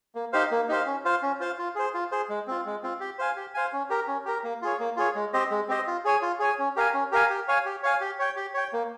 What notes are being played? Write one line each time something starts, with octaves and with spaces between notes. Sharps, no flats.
A#3
D#4 G4 C5 F5
A#3
D#4 G4 C5 F5
C#4
F4 C5 F5
C#4
F4 C5 F5
F4
G#4 C5
F4
G#4 C5
G#3
C4 F4
G#3
C4 F4
G4
C5 F5 G#5
G4
C5 F5 G#5
C#4
G4 A#4
C#4
G4 A#4
A#3
F4 G#4 C#5
A#3
F4 G#4 C#5
G#3
C4 G4 C5 D#5
G#3
C4 G4 C5 D#5
F4
G#4 C#5 G#5
F4
G#4 C#5 G#5
C#4
G4 A#4 F5 G#5
C#4
G4 A#4 F5 G#5
G4
C#5 F5 G#5
G4
C#5 F5 G#5
G4
C#5 G5
G4
C#5 G5
A#3